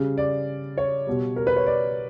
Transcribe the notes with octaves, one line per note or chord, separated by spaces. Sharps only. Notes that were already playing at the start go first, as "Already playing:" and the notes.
Already playing: C#3 G3
D5
C#5
B2 G3
A#4
B4
C#5
D5